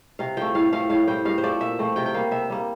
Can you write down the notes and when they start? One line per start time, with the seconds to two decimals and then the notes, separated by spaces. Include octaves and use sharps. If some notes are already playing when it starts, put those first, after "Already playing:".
0.19 C3 F5
0.37 F3 A3 G5
0.55 A2 F5
0.72 F3 A3 C4 F5
0.90 A2 F5
1.08 G3 C4 G5
1.25 G2 F5
1.38 C5
1.43 F3 A3 D5
1.60 A#2 E5
1.79 F3 A3 C4
1.96 C3 G5
2.06 G5
2.14 G3 A#3 F5
2.31 C3 E5
2.50 G3 A#3